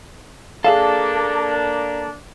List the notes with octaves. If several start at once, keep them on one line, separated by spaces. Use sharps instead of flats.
A#3 D4 G#4 A4 E5 F5